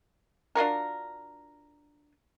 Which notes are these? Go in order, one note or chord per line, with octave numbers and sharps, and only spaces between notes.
D4 F4 F#4 A#4